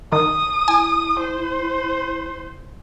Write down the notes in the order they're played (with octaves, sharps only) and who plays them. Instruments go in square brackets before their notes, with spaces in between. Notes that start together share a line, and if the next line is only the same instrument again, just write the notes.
[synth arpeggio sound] D#3 [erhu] D#6
[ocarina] E4 [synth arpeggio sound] G#5
[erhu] C5